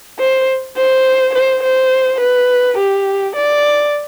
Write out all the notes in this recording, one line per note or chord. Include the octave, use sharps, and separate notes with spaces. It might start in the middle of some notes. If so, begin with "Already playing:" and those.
C5
C5
C5
C5
B4
G4
D5